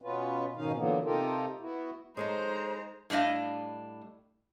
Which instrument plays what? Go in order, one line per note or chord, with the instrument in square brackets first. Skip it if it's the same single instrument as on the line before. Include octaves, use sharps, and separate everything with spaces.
[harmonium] B2 B3 C#4 F4 B4
G#2 B2 D#3 C#4 D#4 F5
A#2 D3 E3 F#3 A#3 B3
C3 D#4 F4 G4 A4 A#4
B3 E4 F#4
[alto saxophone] G#3 [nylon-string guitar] D#4 A4 C#5 [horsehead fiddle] C5 A#5
[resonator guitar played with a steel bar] A2 G3 D4 D#5 F5